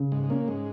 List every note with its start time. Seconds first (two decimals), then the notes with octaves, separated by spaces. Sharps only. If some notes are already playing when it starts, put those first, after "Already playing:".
Already playing: C#3
0.12 G#2 G#3
0.24 G#3
0.30 A#2 A#3 C#4
0.48 G#2 G#3